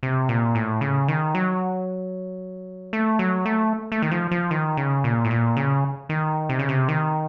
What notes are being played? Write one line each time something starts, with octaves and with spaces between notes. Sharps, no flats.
C3
A#2
A2
C#3
D#3
F#3
A3
F#3
A3
A3
D#3
F3
F3
D#3
C#3
A#2
A2
A#2
C#3
D#3
C3
C#3
C3
D#3